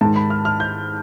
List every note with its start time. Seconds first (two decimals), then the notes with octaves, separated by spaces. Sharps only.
0.01 G#2 D#3 A5
0.16 B5
0.30 F6
0.45 F6
0.60 G6